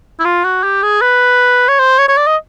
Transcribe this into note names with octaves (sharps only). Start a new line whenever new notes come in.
E4
F4
F#4
G4
G#4
B4
C#5
C5
C#5
C#5
D5
D#5